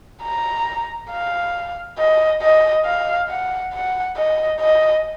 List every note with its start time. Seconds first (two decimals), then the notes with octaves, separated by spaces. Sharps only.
0.23 A#5
1.11 F5
1.98 D#5
2.42 D#5
2.85 F5
3.29 F#5
3.73 F#5
4.17 D#5
4.60 D#5